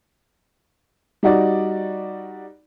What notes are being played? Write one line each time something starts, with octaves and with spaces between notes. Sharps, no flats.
G3 D#4 F#4 D5